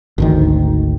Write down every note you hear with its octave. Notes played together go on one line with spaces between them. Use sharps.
G#1 D2 D#3